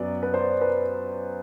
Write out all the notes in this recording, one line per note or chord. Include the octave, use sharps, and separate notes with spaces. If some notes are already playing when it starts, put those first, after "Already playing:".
Already playing: F#2 F#3 B3 D5
B4
C5
B4